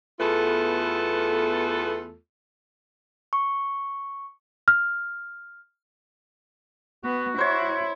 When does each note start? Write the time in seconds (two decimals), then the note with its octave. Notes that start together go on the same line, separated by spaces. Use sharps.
0.20 E2 A3 B3 F4 A4
3.33 C#6
4.68 F6
7.04 B3 F#4
7.38 E4 C5 C#5